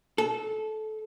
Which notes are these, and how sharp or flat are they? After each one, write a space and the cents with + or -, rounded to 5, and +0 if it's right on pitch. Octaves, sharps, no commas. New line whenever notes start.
A4 -20